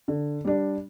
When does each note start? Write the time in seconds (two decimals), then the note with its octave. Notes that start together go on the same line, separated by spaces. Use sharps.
0.08 D3
0.45 G3 D4